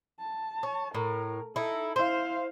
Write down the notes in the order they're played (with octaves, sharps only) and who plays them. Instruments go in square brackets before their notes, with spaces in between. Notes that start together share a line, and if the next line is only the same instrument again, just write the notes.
[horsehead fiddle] A5
[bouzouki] C#5
[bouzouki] A2 [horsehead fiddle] A#4
[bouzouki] D#4 E4 [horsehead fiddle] A4
[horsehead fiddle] E4 F5 [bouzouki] C5